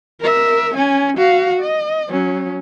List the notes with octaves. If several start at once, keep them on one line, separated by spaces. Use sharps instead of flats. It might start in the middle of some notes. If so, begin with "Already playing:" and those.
A#4 E5
C#4 G#5
F#4 F5
D#5
F#3 C#4